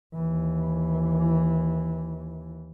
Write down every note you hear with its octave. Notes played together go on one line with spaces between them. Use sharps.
D#2 E3